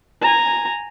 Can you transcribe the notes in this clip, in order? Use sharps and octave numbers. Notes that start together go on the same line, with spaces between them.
G#5 A#5